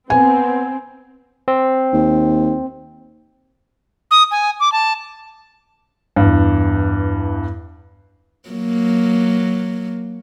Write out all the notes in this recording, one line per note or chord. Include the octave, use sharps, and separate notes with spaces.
B3 C4 G#5
C4
D#2
D#6
G#5
D6
A5
E2 G2
F#3 A#3